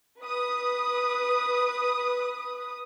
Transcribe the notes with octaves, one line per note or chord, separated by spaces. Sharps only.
B4 D#6